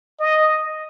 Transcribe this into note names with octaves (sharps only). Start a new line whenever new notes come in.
D#5